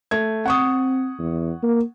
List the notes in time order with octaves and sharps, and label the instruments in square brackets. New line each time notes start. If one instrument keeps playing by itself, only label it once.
[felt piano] A3 G#6
[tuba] C4 [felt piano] F#5 C#6 D#6
[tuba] E2
A#3